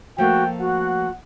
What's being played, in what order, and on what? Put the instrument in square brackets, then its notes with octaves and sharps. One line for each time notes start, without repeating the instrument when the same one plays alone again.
[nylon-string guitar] F3 A3 A#3 [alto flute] F#4 [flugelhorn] G5
[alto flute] F#4 [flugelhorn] F#5